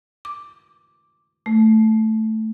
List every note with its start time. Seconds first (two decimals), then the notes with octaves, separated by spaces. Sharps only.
0.25 D6
1.46 A3